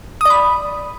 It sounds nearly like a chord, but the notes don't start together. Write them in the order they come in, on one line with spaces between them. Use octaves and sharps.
D#6 D5 B5